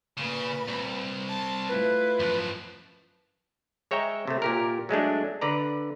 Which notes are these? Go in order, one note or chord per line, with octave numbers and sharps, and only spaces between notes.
A#2 C#3 B4 B5
C2
A5
A3 E4 F4 B4
F#2 F3
G#3 C#5 E5 G5 A#5
C3 A3
A#2 G4 A#4
F#3 G#3 A3 D4
D3 B4 D5 A#5